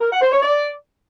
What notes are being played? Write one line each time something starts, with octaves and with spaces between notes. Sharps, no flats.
A#4
F#5
C5
C#5
D5